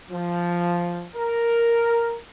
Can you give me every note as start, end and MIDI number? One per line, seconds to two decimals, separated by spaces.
0.11 1.06 53
1.16 2.18 70